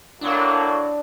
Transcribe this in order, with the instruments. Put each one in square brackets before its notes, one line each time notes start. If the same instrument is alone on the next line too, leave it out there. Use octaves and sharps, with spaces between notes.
[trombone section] A2 F#3 A#3 [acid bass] D4